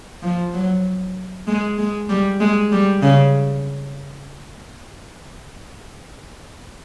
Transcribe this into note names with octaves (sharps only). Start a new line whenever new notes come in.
F3
F#3
G#3
G#3
G3
G#3
G3
C#3